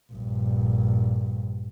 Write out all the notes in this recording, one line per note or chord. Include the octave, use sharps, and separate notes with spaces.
A#1 G2